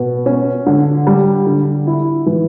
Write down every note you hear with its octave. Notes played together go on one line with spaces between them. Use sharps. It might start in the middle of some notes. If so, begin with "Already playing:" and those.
Already playing: B2
C#4
D3
G3
D3
E4
E3